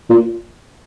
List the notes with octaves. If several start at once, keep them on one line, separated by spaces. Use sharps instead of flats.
A#2